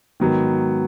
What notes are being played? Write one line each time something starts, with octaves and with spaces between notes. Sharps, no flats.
G#2 D#3 F#3 B3